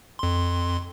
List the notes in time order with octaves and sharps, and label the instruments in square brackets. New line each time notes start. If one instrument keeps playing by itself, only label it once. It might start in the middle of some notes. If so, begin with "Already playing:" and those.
[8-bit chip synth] F2 C6